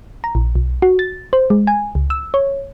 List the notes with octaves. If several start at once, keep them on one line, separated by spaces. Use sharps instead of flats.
A#5
A#1
B1
F#4
A6
C5
G#3
G#5
C#2
E6
C#5